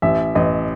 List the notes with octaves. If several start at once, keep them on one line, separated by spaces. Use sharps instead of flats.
A1 E5
A1 D#5